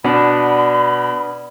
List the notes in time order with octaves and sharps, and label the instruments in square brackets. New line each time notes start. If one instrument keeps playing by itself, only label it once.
[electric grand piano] B2 [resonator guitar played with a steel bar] B3 D4 [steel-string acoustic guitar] D5 [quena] B5